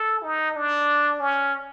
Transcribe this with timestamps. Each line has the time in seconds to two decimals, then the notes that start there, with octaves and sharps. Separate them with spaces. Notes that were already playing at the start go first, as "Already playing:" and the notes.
Already playing: A4
0.23 D#4
0.56 D4
1.20 C#4